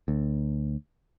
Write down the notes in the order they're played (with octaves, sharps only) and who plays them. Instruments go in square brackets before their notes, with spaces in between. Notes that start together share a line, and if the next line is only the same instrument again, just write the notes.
[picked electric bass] D2